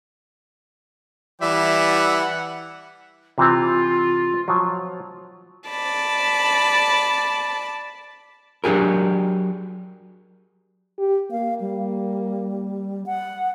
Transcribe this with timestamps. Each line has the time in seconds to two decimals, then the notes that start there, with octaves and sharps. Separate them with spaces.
1.42 E3 G3 D5 E5 F#5
3.38 C3 E3 C4 F4
4.48 F3 F#3
5.69 D5 A5 B5
8.64 F#3 D4 G4 G#4 A#4
10.98 G4
11.31 A#3 F5
11.61 G3
13.06 F#5